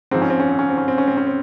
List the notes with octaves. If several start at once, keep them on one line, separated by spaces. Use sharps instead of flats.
G#2 F3 C4
C#4
C4
C#4
C4
C#4
C4
C#4
C4
C#4
C4
C#4
C4